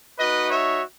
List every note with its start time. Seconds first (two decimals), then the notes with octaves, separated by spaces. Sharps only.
0.18 A3 D#4 F#4 B4 D#5
0.50 C#5 E5